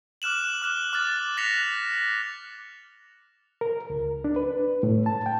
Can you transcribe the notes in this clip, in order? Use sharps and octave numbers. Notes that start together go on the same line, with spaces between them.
D6 F6 F#6 E7 F#7
D6 F6 F#6 E7 G7
D6 F6 F#6 A6
F#6 A#6 B6 C#7 F7
A#4
C#2
D4
B4
A2
A5
G5